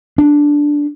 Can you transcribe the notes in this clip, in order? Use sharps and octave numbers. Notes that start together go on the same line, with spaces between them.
D4